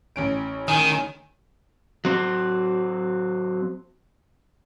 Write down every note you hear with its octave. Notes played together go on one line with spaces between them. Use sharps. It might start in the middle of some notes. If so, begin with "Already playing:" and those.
A1 C#4 D7
D#3 G#5
F#3 C4